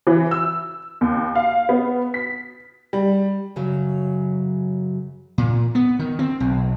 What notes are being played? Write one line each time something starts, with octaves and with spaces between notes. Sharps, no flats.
E3
E6
D#2
F5
B3
B6
G3
F#2 C#3 F#3
A#2
B3
D#3
C4
B1